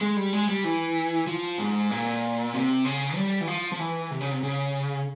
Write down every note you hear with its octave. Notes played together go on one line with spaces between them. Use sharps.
G#3
G3
G#3
G3
E3
F3
G#2
A#2
C3
C#3
G3
E3
F3
F3
E3
C3
C#3
C3
C#3